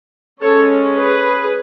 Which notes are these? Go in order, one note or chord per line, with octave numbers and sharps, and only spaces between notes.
G#3 C#4 A4 C#5
G#4 B4